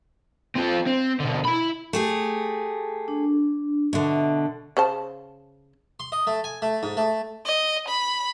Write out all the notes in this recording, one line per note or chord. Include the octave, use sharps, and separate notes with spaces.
C4 F4
C4
B2 D3
E4 B5
A3 G4 G#4
D4
B2 D3 E5
C#3 C5 A5
C6
D#5
A3
G#5
A3
G#2
A3
D#5
B5